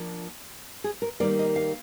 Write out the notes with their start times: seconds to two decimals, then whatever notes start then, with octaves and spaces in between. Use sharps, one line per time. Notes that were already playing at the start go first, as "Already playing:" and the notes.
Already playing: F3 A#3 D4 F4
0.84 G#4
1.02 A#4
1.20 D#3 G3 A#3 D5
1.39 D#5
1.56 F5